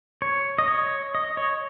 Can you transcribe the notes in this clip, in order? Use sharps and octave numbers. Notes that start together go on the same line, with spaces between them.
C#5
D#5
C#5
D#5
C#5